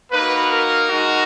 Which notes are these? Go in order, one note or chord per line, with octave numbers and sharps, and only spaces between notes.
A#3 D#4 F#4 B4
A#4
G#3 D#4 F#4